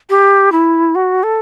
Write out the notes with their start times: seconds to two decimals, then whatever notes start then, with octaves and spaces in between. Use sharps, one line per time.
0.10 G4
0.52 E4
0.95 F#4
1.23 A4